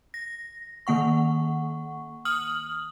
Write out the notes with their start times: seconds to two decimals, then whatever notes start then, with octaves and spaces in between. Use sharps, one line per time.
0.14 A#6
0.87 D#3 A#3 F#5 C#6
2.25 D#6 F6 F#7